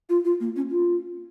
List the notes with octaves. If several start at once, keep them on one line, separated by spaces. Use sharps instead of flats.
F4
F4
A#3
C#4
F4